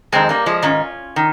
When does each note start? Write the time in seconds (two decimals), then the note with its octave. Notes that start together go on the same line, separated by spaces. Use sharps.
0.12 F2 D#3 G#3 C4
0.29 G3 A#3
0.46 F3 G#3
0.63 G#2 D#3 C#4 F4
1.16 D#3